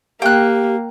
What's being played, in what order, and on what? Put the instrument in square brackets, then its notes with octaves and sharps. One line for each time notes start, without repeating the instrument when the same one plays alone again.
[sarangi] A#3 [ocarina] G4 [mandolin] G5 F#6